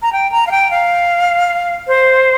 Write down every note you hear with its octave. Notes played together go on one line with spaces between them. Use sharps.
A#5
G5
A#5
F5
G5
F5
C5